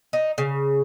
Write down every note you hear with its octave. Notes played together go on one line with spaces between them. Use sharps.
D#4
C#3